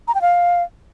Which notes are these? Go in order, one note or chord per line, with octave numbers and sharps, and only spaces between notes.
A#5
G5
F5